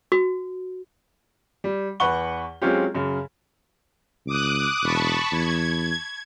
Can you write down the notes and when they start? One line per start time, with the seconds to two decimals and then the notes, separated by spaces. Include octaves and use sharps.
0.12 F#4
1.64 G3
2.00 E2 B4 F#5 C#6 G7
2.62 F#3 G#3 C4 C#4 F4 G4
2.95 F#2 C#3
4.26 C#2 D6 D#6 F#6
4.83 E1 A5 B5 C#6
5.32 E2 G#6